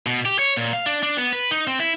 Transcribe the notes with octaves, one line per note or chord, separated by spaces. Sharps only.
B2
G4
C#5
A#2
F5
D4
D4
B3
B4
D#4
C4
E4